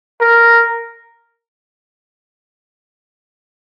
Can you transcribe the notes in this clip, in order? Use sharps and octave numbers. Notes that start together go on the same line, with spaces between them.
A#4